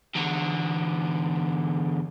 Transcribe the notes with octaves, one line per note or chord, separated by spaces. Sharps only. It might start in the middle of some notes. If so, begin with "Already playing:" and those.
E2 D3